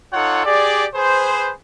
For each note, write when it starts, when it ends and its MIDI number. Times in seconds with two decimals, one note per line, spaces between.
0.13 0.44 63
0.13 0.44 65
0.13 0.44 69
0.13 0.44 73
0.13 0.44 78
0.45 0.86 67
0.45 0.86 68
0.45 0.86 74
0.95 1.51 68
0.95 1.51 71
0.95 1.51 72